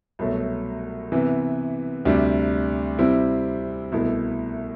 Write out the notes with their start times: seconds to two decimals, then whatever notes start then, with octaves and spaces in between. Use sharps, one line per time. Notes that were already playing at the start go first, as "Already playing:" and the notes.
0.19 C2 B2 F#3 A3
1.12 C3 E3 B3
2.05 D2 C3 G3 D4
2.99 C3 G3 C4 E4
3.92 C2 B2 A3 E4